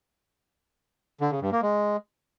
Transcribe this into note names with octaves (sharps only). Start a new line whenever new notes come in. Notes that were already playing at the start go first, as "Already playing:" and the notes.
D3
C#3
G2
A#3
G#3